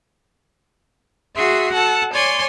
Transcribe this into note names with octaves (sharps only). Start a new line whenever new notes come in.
F#4 G#4 E5 C6
A4 F#5 A5
C#5 D5 G#5 C6